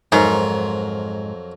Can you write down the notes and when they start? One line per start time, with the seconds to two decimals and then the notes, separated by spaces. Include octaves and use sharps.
0.12 F2 G#2 F#3 A#4